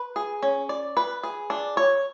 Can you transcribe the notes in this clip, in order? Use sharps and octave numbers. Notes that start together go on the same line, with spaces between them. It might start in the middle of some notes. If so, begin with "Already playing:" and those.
Already playing: B4
G#4
C#4
D5
B4
G#4
D4
C#5